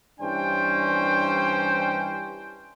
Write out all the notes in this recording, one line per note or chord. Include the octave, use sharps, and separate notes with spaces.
G2 E3 C#4 D4 C5 G5